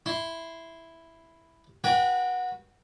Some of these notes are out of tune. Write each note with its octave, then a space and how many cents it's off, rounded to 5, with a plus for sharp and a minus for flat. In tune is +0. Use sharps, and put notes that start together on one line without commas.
E4 +0 C6 -10
F#4 -15 B4 -35 G5 +0